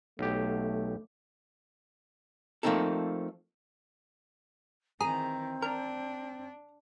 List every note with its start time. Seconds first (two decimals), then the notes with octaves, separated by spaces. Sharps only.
0.19 B1 A3 G4
2.63 F3 A3 A#3 C4 D#4 A4
5.01 D#3 E3 C4 G#4 A#5
5.62 D4 A#4